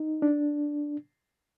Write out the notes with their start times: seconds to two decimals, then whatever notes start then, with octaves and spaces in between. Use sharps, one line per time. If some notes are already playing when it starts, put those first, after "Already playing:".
Already playing: D#4
0.22 D4